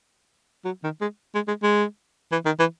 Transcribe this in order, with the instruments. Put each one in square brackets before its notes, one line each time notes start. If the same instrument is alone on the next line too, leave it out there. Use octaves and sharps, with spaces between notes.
[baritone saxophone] F#3
D#3
G#3
G#3
G#3
G#3
E3
D#3
E3